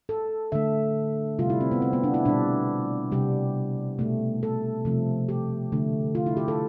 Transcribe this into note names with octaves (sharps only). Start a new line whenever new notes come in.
A4
D3 A3 E5
C3 G3 F4
E4
C4
B3
C4
B3
D4
E4
B2 G3 D4
C3 G3 G4
B2 A3
A4
C3 F3 A3
G4
D3 A3
F4
E4
G4
A4